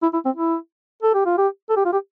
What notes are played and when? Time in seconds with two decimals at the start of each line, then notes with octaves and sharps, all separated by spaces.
0.02 E4
0.13 E4
0.25 C4
0.36 E4
1.03 A4
1.14 G4
1.26 F4
1.38 G4
1.69 A4
1.76 G4
1.85 F4
1.92 G4